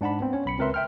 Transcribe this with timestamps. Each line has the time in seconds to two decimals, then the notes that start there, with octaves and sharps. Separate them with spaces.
0.01 G#2 D4 F#5 A5 B5
0.20 B3 C4
0.33 C#4 C#5
0.46 B1 B5 C#7
0.58 C#2 C4 A#4 B4 E5 C6
0.74 E5 G5 F6